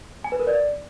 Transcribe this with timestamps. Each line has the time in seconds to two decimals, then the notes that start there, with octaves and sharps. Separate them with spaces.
0.24 G#5
0.32 B4
0.39 A#4
0.47 D5